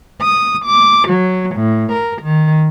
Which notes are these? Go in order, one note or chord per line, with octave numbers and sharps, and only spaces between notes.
D#6
D6
F#3
A2
A#4
D#3